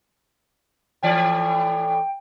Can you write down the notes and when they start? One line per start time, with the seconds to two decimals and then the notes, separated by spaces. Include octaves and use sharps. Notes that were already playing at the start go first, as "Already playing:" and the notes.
1.03 A2 E3 D5 G5